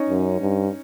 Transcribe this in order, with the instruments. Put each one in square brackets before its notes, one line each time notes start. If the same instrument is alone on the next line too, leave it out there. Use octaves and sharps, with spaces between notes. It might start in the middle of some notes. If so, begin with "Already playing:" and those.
Already playing: [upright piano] C#4 D#4
[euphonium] F#2
G2